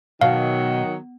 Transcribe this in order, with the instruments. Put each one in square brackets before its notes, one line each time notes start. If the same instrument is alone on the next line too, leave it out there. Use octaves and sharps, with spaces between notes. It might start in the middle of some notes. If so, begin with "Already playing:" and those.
[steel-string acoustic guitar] B2 [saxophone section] D#3 F#3 [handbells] F5